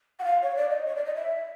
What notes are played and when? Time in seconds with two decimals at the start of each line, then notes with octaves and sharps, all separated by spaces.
0.19 F#5
0.24 F5
0.42 C#5
0.56 D5
0.69 D#5
0.86 C#5
0.95 D5
1.05 D#5
1.15 E5